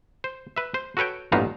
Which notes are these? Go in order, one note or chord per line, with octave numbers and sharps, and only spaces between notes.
C5
B4 E5
C5
F#4 A4 B4 C#5 G5
A1 G2 A#2 B3 D#4 F5